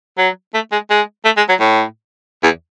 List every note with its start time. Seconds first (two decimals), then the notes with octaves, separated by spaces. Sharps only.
0.18 F#3
0.54 A3
0.72 G#3
0.90 G#3
1.25 A3
1.37 G#3
1.49 F#3
1.60 A2
2.43 E2